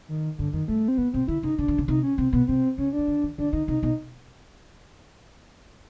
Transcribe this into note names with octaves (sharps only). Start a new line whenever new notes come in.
D#3
G2 D3
F#2 D#3
G2 A3
C4
A2 B3
B2 C4
D3 E4
C#3 D#4
C#3 D4
D3
C#3
C3 D#4
C#4
C3 C4
B2 B3
C3 C4
C#3 C#4
D4
E3
D#3
D#3
D3 D4
D3 D#4
C3 D#4
B2 D#4